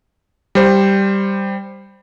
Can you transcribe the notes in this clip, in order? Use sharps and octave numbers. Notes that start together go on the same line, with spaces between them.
G3 C5